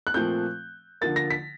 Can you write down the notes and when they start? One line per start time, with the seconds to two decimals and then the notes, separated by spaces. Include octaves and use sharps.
0.07 F#6
0.14 A#2 F3 A3 C4 G6
1.01 D3 F3 A#3 A6
1.16 A#6
1.31 B6